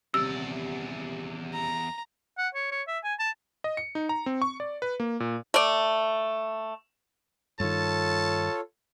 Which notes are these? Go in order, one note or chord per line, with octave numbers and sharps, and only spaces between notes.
D#1 E2 C3 D5 E6
A#5
F#5
C#5
C#5
E5
G#5
A5
D#5
C#7
D#4
A#5
C4
C#6
D5
B4
A#3
A#2
A3 D5
G2 D#3 F4 A4 C#5 A5